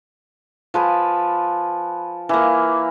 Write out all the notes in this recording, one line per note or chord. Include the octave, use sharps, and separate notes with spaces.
F3 B4 G#5
E3 A#3